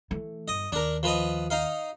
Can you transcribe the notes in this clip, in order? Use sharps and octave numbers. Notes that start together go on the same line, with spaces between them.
E3 A3
G1 D#5
D#2 D4 A#4
F3 B4 D#5
D#4 F5